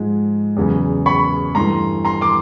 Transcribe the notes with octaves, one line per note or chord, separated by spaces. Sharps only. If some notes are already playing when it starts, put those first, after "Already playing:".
Already playing: G#2 F3 G#3
E2 C#3 F#3
B5 C#6
G2 E3 A3 A#5 C6
A#5 C6
C6 D6